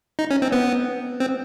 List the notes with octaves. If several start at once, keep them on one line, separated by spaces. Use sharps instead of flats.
D#4
C#4
C4
B3
C4